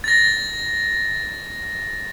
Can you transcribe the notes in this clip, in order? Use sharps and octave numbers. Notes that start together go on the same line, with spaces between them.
A6 A#6